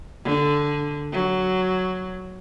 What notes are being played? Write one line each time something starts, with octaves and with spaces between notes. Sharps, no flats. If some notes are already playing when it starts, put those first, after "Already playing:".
D3
F#3